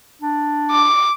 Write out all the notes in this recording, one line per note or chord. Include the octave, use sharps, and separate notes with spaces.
D4
D6